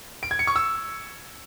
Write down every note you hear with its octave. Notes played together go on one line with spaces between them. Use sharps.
D7
G#6
C#7
C#6
E6